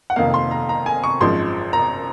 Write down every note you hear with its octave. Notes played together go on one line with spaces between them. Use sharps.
F#5
F1 F2 D#3 A#3 F5
C6
A#5
A#5
G#5
C#6
G#1 F#2 F3 G#3 C6
A#5